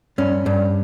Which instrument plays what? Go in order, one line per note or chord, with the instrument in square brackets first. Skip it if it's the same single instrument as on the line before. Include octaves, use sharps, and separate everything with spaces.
[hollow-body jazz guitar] G2 C#4
G2